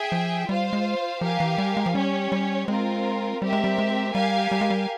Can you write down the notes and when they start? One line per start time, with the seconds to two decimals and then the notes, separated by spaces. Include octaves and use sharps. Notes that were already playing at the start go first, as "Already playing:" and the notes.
Already playing: G#4 E5 G5
0.12 F3
0.48 G3 F4 C5 F5
0.73 G#3
1.21 F3 G4 A#4 F5 G#5
1.40 E3
1.58 G3
1.77 G#3
1.86 F3
1.95 G3 C#4 G4 C#5
2.32 G3
2.68 G#3 C4 F4 A#4
3.42 G3 C4 G4 A#4 E5
3.53 G#3
3.64 G3
3.78 G#3
4.15 G3 G4 A#4 F5 G#5
4.52 G3
4.61 G#3
4.70 G3